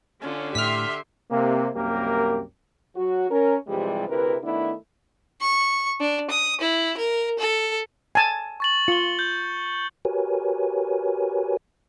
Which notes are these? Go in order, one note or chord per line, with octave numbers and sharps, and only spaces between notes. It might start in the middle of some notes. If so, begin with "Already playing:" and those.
D3 C#4 F4
A2 G4 E5 C6 F6 B6
C3 A#3
C2 F#2 A#3 G4 A#4
F#3 F#4
C#4 A#4
G2 C3 E3 F3 G3 G#3
D2 C3 E4 A#4 B4
D#3 A3 B3 D4 E4
C#6
D4
D#6
E4
A#4
A4
G#5 A5
C#6 A6 F#7
F4 C#7 G7
G6
F#4 G4 A#4 B4 C#5 G#5